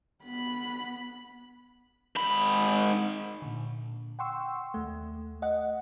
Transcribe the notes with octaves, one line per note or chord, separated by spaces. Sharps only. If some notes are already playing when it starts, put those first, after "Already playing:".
B3 B5
G#2 B5
A#2 D3
F#5 G5 C6 C#6 E6
D#2 A3
D#5 F#5